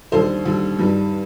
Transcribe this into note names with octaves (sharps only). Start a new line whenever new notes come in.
D#2 D3 G3 C5
D#2 D3 G3
G2 D#3 G3